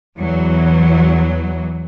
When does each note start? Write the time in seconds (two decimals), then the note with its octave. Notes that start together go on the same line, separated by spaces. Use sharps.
0.18 E2 E3 F#3